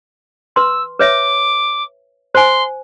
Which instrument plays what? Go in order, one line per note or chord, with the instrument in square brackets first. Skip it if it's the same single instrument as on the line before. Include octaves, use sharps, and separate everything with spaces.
[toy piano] B4 C6 [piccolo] E6
[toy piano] B4 C#5 E5 [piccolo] D6
[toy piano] C5 G#5 [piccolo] C6